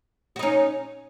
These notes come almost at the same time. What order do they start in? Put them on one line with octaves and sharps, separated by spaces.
F#4 D#4 C#4